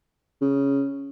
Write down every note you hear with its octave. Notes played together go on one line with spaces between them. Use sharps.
C#3